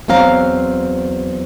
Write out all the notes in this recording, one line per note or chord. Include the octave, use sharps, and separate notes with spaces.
E2 F#3 C4 F5 A#5